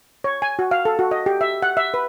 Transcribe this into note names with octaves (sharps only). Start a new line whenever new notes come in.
C#5
G#5
F#4
F5
A4
F#4
D#5
G4
E5
F#5
E5
B4